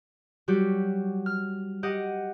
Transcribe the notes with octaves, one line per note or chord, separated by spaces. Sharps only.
F#3 G3 F#4 G4
F6
G4 D#5 F#5